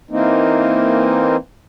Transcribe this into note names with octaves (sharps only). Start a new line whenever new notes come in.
E3 A#3 C4 D#4